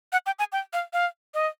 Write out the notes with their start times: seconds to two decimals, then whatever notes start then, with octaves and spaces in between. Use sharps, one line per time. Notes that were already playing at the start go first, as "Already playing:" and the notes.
0.12 F#5
0.26 G5
0.39 G#5
0.52 G5
0.73 F5
0.93 F5
1.34 D#5